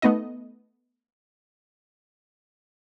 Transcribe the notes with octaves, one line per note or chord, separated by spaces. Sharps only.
A3 B3 D#4 D#5